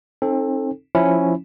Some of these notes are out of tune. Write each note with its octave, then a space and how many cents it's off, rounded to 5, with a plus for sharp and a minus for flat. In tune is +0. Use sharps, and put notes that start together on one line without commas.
C4 +35 D#4 +0 A4 +0
F3 +0 C#4 +0 E4 +0